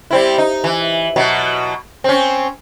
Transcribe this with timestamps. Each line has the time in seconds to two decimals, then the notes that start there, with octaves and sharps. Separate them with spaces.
0.11 G3 C4 E4
0.38 D#4
0.64 E3
1.16 B2 F#3
2.04 C4 C#4